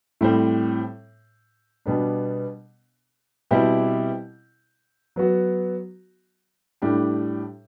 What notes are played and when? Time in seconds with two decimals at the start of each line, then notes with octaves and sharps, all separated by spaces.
0.21 A2 G3 C4
1.86 B2 G3 B3 D4
3.51 B2 G3 C4 E4 G4
5.16 F#3 B3 F#4
6.82 A2 G3 D4 G4